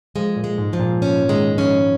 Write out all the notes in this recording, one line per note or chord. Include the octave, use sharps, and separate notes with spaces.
F3 G#3
A#2
G#3
G#2
F3
A#2
C#4
D#3 G#3
F3 C#4